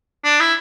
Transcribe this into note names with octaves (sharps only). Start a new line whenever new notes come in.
D4
E4